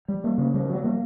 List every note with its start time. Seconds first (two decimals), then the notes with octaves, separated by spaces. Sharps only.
0.08 G3
0.24 A#3
0.38 C#3
0.54 G3
0.69 F#3
0.84 A#3